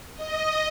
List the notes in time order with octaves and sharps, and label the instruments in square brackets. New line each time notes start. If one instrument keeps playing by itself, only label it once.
[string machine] D#5